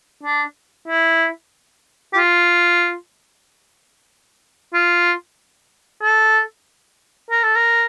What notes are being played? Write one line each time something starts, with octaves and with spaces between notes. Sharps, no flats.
D4
E4
G4
F4
F4
A4
A#4
A4
A#4